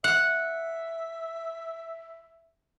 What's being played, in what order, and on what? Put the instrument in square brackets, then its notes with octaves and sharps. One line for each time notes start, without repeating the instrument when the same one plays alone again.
[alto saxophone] E5 [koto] F#5